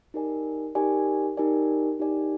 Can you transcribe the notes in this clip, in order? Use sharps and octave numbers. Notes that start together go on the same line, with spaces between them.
D#4 G4 A#4 D5 G#5
D#4 G4 A#4 D5 G#5
D#4 G4 A#4 D5 G#5
D#4 G4 A#4 D5 G#5